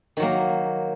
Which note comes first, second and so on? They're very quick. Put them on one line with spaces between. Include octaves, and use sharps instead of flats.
D#3 F#3 A#3